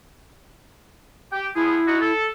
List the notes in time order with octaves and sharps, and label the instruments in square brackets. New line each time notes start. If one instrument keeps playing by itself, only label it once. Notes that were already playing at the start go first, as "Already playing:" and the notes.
[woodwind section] G4 G5
[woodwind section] F3 B3 G#4 [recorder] E4
[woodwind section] D#4 F#4
A4